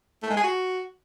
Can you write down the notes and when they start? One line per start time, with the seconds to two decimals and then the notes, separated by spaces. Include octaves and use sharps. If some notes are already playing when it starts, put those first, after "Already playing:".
0.23 A3
0.30 G#3
0.37 G#4
0.44 F#4